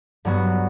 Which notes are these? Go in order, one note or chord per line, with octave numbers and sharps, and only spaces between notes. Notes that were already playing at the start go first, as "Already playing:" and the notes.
G2 F#3 B3 F#4